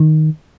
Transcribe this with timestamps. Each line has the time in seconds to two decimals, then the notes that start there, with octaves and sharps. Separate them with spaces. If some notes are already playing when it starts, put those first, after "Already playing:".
Already playing: D#3